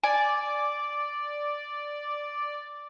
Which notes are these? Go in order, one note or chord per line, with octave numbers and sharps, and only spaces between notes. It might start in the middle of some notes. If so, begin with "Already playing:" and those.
D5 G#5